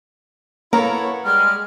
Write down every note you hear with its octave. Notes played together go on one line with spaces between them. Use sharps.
A#3 B3 E4 A4 A#4 C#5 A#5
G3 G#3 F6